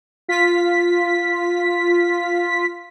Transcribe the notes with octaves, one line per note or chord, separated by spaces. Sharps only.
F4 B6